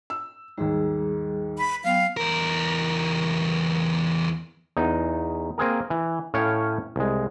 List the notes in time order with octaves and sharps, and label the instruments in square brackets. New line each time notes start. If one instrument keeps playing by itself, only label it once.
[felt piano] E6
[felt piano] D#2 G#2 [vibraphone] G3 G#4
[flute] B5
[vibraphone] F#3 B3 G5 [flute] F5
[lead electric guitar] E2 A#4
[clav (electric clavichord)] E2 D#4
A#3 C4 G#4 A#4
E3
A2 C#4 C#5 F5 G5
C2 G#3